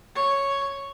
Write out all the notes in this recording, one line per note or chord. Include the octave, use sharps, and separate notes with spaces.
C#5